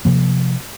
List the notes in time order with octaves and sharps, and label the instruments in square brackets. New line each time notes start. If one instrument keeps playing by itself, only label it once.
[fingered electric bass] C3 F3 A#3